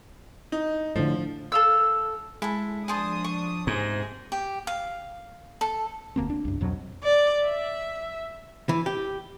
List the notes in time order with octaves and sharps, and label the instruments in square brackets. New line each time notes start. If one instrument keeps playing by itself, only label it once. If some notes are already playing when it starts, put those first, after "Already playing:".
[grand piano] D#4
[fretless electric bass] A2 D3 [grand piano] F3
[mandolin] A4 F5 E6
[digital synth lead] G#3 [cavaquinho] E4 A4
[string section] F3 D4 D#6 [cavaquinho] G#4 C5 A5
[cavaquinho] C#6
[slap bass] G#2 [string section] C3 C4 G#4 [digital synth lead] A#6
[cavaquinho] G4
F5
A4
[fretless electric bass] E1 D2 A#3 C4
D4
C2 F#2
F2 B2 F#3
[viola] D5
E5
[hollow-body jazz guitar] E3
G4